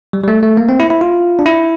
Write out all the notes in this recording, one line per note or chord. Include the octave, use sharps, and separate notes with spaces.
G3
G3
A3
A3
A#3
C4
E4
E4
F4
D4
E4